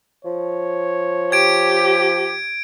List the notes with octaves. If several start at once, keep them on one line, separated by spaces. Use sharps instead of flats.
F3 C#5
G4 G#6 D7